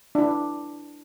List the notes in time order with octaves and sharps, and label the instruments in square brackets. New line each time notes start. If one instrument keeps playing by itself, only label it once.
[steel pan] D4 E4